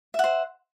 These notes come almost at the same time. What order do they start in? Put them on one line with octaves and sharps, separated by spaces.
E5 F#5 C5